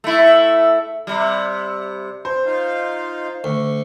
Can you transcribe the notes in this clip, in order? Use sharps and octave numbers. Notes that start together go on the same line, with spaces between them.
A3 E4
C3 G3
C4 C5
D#4 F4 F5
D2 C#6